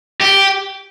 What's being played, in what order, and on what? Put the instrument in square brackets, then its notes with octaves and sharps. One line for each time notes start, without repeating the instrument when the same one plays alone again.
[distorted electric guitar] G4